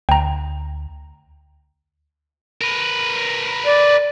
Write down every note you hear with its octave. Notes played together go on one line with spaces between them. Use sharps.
D2 G5 A#5
A#4 B4
D5